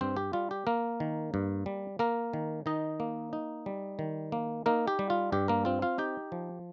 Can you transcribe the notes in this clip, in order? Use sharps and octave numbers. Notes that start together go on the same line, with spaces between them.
G2 C4 C5
G4
G3 F4
G4
A#3 A#4
D#3
G2
G3
A#3 A#4
D#3
D#3 D#4 D#5
A#3
D#4
G3
D#3
A#3
A#3 D#4 A#4
G4
G3
F4
G2 G4
A#3 A#4
C4 F4
F4 F5
D#4 G4 G5
F3